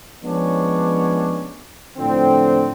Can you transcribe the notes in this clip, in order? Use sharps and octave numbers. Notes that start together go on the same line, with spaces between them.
F3 G#3 B3 C#4 D4 C#5
A2 D3 F3 C4